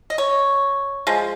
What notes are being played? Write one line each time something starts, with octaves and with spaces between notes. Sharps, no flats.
D#5
C#5
F3 G#3